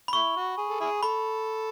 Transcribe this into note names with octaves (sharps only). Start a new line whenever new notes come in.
B5
A3 E4 C#6
F#4
G#4
A4
E4 G#4
A4 B5